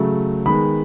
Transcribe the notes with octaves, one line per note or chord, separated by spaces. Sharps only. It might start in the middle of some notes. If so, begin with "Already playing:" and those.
Already playing: C#3 F#3 A3
D#3 G#3 B3 B5